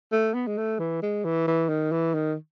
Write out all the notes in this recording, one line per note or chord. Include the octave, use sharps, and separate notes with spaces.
A3
B3
G#3
A3
E3
G#3
E3
E3
D#3
E3
D#3